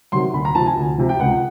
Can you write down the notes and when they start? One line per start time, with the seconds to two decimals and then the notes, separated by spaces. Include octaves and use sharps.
0.12 C3 D#3 F#3 C6
0.34 D2 B5
0.45 A#5
0.55 C3 F3 A5
0.66 G#5
0.77 D2
0.98 C3 F3
1.09 G5
1.19 C#2 F#5